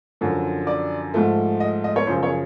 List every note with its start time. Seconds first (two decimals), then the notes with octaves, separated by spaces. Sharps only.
0.21 F#2 D3 F3
0.67 D5
1.14 G#2 F3 A3
1.60 D#5
1.84 D#5
1.96 C#5
2.07 F#2 C#3 F3 C5
2.23 C#5